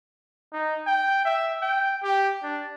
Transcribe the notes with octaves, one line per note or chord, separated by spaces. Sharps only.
D#4
G5
E5
G5
G4
D4